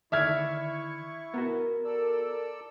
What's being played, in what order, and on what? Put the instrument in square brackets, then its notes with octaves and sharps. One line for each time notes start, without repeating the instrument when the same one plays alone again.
[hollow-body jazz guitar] D3 D#3 D5 [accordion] E4 C#6 [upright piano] E5 F6 G#6
[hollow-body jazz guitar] B3 F#4 [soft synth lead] A#4
[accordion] A4 D5 E6